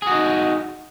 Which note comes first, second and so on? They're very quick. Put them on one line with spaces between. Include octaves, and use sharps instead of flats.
G#4 F#4 D#4